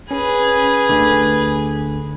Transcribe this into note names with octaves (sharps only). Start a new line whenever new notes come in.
C#4 G#4 B4
D2 D3